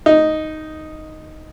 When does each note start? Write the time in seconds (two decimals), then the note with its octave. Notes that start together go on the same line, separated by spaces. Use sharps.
0.06 D#4